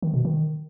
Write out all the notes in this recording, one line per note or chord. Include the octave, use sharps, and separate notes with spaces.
D#3
B2
D#3